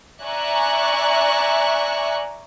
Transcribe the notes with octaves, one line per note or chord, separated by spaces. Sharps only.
D5 E5 G#5 A#5 C#6 F#6